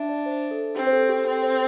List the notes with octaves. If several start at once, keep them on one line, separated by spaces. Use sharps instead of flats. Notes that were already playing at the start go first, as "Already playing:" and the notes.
Already playing: D4 E5 A5
D5
C5
A4
C4 G4
C5
A4
G4
C4 A4
C5